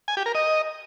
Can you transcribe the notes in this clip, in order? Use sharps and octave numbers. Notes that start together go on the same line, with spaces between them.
G#5
G4
A#4
D#5